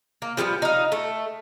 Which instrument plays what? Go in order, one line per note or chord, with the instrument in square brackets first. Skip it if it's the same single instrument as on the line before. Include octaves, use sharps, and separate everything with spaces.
[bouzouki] A#3
F3 G3 A#3 B3
D#4 F5
A3